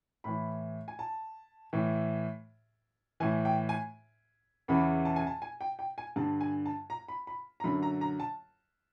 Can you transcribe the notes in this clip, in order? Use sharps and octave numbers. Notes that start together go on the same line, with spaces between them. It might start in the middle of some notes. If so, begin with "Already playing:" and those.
A2 E3 B5
G#5
A5
A2 E3
A2 E3 G#5
G5
G#5
E2 C#3 E3 B5
A5
G#5
A5
G#5
G5
G5
G#5
G2 D3 A5
G#5
A5
A#5
B5
B5
A#5
F#2 D3 B5
A#5
A#5
A5